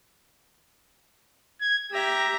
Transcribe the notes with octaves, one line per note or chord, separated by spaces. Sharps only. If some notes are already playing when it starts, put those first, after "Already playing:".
G#6
G4 E5 A#5